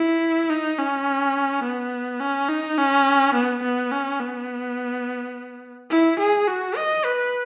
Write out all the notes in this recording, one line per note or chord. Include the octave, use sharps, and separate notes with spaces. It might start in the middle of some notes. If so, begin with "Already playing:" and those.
Already playing: E4
D#4
C#4
B3
C#4
D#4
C#4
B3
B3
C#4
B3
E4
G#4
F#4
D#5
B4